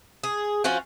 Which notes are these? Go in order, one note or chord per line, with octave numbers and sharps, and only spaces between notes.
G#4
F3 C#4 F4 F#4